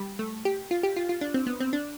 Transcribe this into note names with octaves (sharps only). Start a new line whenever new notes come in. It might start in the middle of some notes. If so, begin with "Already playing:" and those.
Already playing: G3
A3
G4
F4
G4
F4
F4
D4
C4
B3
C4
D4